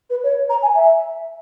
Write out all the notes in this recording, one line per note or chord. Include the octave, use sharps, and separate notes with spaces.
B4
C#5
A#5
G#5
E5